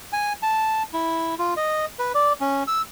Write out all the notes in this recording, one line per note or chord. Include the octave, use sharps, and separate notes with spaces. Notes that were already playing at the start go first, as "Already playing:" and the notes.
G#5
A5
E4
F4
D#5
B4
D5
C#4
E6